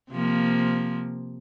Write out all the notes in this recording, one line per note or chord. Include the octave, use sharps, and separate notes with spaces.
C3 F3 A#3